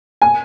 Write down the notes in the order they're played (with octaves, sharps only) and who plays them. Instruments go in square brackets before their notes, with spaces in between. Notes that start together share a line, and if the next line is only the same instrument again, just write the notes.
[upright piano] G#5